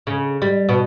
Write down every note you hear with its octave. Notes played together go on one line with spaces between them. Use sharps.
C#3
G3
B2